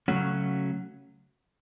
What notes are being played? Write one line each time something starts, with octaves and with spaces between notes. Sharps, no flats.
C#3 F#3 A3 C#4 F#4